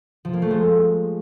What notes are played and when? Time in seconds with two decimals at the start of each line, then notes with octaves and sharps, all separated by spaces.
0.25 F3
0.33 A#3
0.42 A3
0.51 G#3